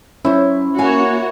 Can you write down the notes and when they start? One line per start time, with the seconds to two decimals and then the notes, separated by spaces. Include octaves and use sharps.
0.25 F#3 C#4 E4 C5
0.78 A#3 F#4 C#5 F5 G#5